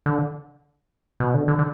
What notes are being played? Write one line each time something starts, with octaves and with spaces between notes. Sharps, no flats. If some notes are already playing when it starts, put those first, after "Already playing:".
D3
B2
D3
D3
D3